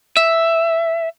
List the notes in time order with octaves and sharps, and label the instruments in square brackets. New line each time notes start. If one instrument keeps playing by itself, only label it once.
[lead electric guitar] E5